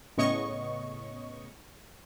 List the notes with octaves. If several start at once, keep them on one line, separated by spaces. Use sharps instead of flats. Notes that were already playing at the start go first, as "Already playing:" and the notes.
A2 C#3 B3 C#5 D#5 C#6